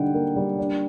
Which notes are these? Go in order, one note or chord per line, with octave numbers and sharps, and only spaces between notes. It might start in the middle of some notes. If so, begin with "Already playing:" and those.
Already playing: D3 G3 A#3 D#4 F#5 G5
A#3
G3
D4